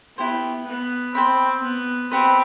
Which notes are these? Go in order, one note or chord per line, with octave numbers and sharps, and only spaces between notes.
B3 E4 G4 C5
B3
C4 C5 G5 B5
B3
C4 G4 B4 F#5 B5